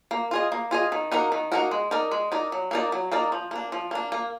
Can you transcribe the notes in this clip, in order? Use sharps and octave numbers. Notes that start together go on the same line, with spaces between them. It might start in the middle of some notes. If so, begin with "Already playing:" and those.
A#3
F4 G#4 D#5
A#3
F4 G#4 D#5
D#3
A#3 D#4 F#4 A#4
D#3
A#3 D#4 F#4 A#4
G#3
D#4 A#4 D5
G#3
D#4 A#4 D5
F#3
A#3 D#4 A#4 D5
F#3
A#3 D#4 A#4 D5
F3
A#3 D4
F3
A#3 D4
A#3